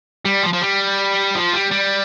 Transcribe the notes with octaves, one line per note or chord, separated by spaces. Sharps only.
G3
F3
F3
G3
F3
G3
G3